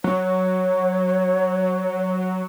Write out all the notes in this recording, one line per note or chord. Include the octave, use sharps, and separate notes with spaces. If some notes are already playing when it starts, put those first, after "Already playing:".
F#3 C#5